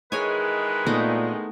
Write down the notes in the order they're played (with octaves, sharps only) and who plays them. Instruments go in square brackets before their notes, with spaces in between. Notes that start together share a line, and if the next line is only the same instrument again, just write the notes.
[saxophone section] D#3 E3 G#3 [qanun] G#4 C#5 G#5 [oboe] B4
[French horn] A#2 [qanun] A3 B3 D#4